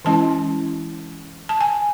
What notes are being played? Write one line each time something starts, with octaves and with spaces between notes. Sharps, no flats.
E3 G#3 C#4 E4 A5
A5
G#5